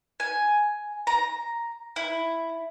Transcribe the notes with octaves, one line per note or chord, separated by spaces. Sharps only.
G#5
A#5
E4